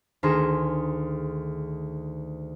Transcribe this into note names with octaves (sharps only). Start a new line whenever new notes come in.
D2 D#3 G#4 C6 A#6 E7